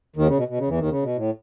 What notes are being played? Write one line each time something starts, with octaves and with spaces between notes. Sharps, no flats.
D#2 D#3
C#3
B2
B2
C#3
E2 E3
D#2 D#3
C#3
B2
A2